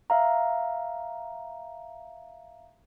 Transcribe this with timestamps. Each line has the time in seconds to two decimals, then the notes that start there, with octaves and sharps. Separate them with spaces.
0.10 E5 F5 A#5